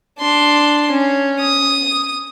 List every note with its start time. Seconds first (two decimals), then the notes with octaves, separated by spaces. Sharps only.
0.18 D4 C6
0.91 C#4
1.40 D#6